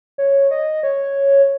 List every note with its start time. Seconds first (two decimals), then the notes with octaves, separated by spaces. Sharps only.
0.18 C#5
0.51 D#5
0.83 C#5